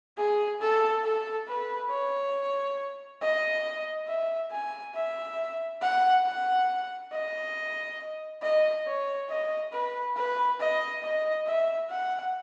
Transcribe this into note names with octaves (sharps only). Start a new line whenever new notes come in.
G#4
A4
A4
B4
C#5
D#5
E5
G#5
E5
F#5
F#5
D#5
D#5
C#5
D#5
B4
B4
D#5
D#5
E5
F#5